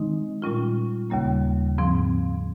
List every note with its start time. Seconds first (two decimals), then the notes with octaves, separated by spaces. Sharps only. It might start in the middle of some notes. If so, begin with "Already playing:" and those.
Already playing: D#3 G#3 C4 D#4
0.42 A#2 G3 C#4 F4
1.10 D#2 C#3 G3 A#3
1.78 G#2 F3 C4